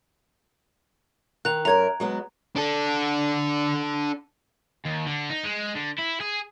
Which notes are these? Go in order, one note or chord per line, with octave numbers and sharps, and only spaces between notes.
D#3 F#6 F7
F#2 A4 A#4 A#5 G#6
F#3 G#3 B3
D4 A4
D#2
D3
D#4
G#3
D3
E4
G#4